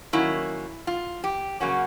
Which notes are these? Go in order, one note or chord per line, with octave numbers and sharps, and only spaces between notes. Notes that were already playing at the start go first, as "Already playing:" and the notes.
D#3 F#3 A#3 C#4 E4
F4
G4
C#3 F#3 A#3 C#4 F#4